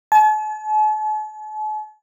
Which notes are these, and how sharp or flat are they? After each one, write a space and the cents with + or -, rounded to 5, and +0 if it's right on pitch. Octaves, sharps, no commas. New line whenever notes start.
A5 -45